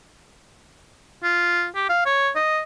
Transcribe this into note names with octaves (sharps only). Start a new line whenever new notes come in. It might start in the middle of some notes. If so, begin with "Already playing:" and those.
F4
G4
F5
C#5
D#5